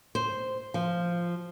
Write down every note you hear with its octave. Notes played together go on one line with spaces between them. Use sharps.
C5
F3